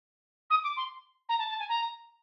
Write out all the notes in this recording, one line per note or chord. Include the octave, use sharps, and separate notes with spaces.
D#6
D6
C6
A#5
A5
A5
G#5
A#5